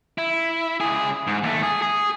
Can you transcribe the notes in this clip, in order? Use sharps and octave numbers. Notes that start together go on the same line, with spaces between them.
E4
C#2 G#4
G#2
D#2 A3
G#4
G#4